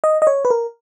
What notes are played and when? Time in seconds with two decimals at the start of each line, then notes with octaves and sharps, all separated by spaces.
0.04 D#5
0.22 D#5
0.27 C#5
0.45 B4
0.50 A#4